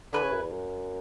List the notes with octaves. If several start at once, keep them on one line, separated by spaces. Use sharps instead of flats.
D3 E4 B4 E5 G#5
C#3
F#2
E2
F#2